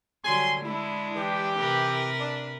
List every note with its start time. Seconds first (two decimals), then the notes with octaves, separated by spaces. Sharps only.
0.24 D3 F#3 G3 G#5 C6
0.63 G#3 D4 E4
1.16 E3 G4
1.59 C3 A#4 B4
2.20 D4